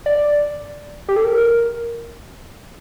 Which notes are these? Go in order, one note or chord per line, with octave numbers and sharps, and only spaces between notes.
D5
G4
A4
A#4